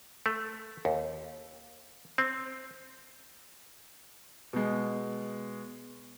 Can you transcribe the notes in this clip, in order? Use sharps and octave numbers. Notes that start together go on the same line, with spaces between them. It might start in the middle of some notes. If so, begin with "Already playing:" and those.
A3
D#2
C4
B2 G#3